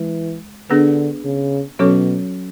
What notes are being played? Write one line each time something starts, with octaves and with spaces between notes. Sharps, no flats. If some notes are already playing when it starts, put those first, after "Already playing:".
Already playing: E3 G#3
D3 B3 D4 G#4 B4
C#3
B2 F#3 C#4 F#4 A4 C#5